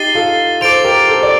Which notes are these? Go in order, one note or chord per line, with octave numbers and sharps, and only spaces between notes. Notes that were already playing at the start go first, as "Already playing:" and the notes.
Already playing: D#4 G4 A6 C7 D#7 G7
F4 A4
A4 C5 D6 A6 D7 F7
G4 A#4
A4 C5
D5